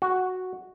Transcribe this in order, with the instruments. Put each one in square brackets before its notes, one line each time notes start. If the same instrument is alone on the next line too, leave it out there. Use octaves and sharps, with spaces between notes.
[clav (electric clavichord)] F#4